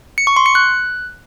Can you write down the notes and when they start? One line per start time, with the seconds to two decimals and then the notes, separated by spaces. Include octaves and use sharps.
0.18 C#7
0.27 C#6
0.36 C6
0.46 C#7
0.55 F#6